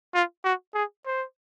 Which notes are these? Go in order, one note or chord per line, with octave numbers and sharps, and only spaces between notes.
F4
F#4
G#4
C5